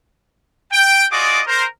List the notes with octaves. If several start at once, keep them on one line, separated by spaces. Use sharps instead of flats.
G5
F4 F#4 G#4 D5 D#5 D6
A#4 C5